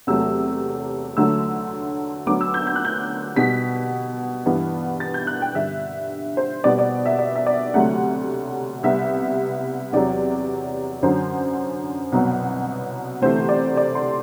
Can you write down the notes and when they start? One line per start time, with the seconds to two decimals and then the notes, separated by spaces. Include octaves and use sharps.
0.07 E2 C3 F#3 A3 E6
1.17 D2 D3 F#3 A3 E6
2.26 D2 D3 F#3 B3 D6
2.41 E6
2.54 G6
2.67 G6
2.76 F#6
2.85 G6
3.36 B2 G3 B3 B6
4.46 G2 E3 B3
5.00 A6
5.14 G6
5.27 F#6
5.42 G5
5.55 G2 D3 G3 E5
6.37 C5
6.64 B2 G3 B3 D5
6.79 D5
7.06 E5
7.19 D5
7.36 E5
7.47 D5
7.74 D2 C3 F#3 A3 F#5
8.83 C2 C3 G3 B3 E5
9.93 E2 C3 F#3 D5
11.03 F#2 D3 F#3 C5
12.12 C2 B2 F#3 B3
13.21 D2 C3 E3 A3 C5
13.49 D5
13.77 D5
13.95 C6